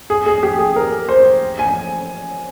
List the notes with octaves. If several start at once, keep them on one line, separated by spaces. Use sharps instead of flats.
G#4
G#4
G4
G#4
A#4
C5
G#5